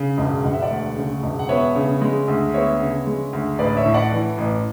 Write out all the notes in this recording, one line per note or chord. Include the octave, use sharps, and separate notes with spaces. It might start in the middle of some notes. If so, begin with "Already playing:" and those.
Already playing: C#3
E1
E1 F#5
E5
D5 F#5
D2
C#3
E1
F#5
B3 C#5 E5
C#3
G#3
D2
B3 C#5 E5
C#3
G#3
D2
A1 B4 D5
C#5 E5
A2
D5 F#5
E3
A1